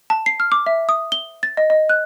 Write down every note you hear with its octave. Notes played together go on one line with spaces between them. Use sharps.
A5
C7
F6
D6
E5
D#6
G7
A6
D#5
D#5
F#6